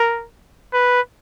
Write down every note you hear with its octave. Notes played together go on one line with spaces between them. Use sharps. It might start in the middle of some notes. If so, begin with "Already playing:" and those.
Already playing: A#4
B4